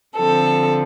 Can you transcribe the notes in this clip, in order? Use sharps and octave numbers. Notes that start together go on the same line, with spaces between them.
D3 F3 C4 A4